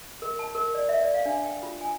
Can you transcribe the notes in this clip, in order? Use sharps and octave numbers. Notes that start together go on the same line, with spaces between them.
A#4
A5
A#4
D5
E5
D5
F5
D4
G5
F4
G#5